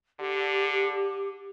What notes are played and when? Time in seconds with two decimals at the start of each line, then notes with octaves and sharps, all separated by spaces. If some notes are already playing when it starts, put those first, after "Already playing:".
0.20 D3 G4